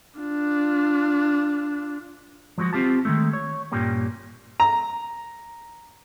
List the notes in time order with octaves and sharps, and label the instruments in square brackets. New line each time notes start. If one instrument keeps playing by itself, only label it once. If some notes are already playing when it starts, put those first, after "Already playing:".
[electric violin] D4 F4
[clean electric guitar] F3 F#3 G#3 F#4
C4 F4 G4 A5
D#3 G#3 A3
C#5
G2 A#2 G3 A#3 C#4
[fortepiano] A#5